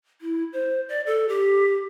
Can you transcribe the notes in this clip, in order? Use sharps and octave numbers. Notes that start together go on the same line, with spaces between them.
E4
C5
D5
A4
G4